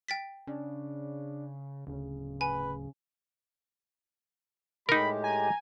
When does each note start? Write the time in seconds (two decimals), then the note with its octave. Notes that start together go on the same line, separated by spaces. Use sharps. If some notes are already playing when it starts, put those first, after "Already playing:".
0.08 G5 A6 B6
0.47 C#3 D4
1.87 D1 C#3
2.41 B4 G#5
4.89 A2 G#3 D#4 G4 A#4 B5
5.24 G#5 A#5